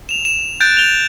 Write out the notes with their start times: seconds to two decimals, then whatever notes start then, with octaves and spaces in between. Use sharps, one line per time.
0.09 E7 F7
0.25 E7
0.60 F#6 G6 A6 D7
0.77 F7 G7